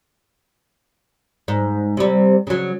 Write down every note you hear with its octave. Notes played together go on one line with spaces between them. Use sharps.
G#2
C3 G3
C#3 F#3